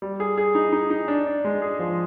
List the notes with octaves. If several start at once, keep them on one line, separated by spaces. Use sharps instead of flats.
G3
G#4
G#4
D#4
D#4
D#4
D4
D4
G#3
G#4
F3